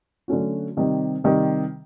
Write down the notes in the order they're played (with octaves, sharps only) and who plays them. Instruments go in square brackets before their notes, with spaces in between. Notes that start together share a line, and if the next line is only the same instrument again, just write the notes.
[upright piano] D3 F#3 A3 C#4 F#4
C3 D#3 G3
C3 D#3 G3